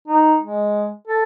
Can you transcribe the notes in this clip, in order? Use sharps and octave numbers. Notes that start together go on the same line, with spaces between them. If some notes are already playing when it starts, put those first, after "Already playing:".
D#4
G#3
A4